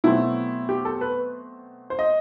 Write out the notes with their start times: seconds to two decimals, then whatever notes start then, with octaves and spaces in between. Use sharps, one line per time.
0.04 B2 F#3 A3 C4 E4
0.69 G4
0.85 A4
1.01 B4
1.90 C5
1.99 D#5